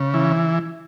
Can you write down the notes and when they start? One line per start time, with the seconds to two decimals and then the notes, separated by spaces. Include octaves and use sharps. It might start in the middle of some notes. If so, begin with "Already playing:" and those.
Already playing: C#3
0.14 E3